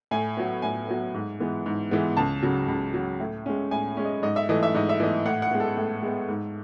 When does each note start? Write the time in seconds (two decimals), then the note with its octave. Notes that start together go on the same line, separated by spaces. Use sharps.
0.11 A2 G#5
0.37 F#3 B3
0.62 A2 G#5
0.88 F#3 B3
1.14 G#2
1.40 E3 G#3 B3
1.66 G#2
1.91 E3 G#3 B3
2.17 C#2 A5
2.43 C#3 F#3
2.68 C#2
2.94 C#3 F#3
3.20 A2
3.46 G#3 C#4
3.71 A2 G#5
3.97 G#3 C#4
4.05 D#5
4.22 G#2 D#5
4.36 E5
4.49 E3 A3 D#5
4.63 E5
4.74 G#2 D#5
4.89 E5
5.00 E3 A3 D#5
5.25 A2 F#5
5.42 F#5
5.51 G#3 B3
5.60 A4
5.77 A2
6.03 G#3 B3
6.29 G#2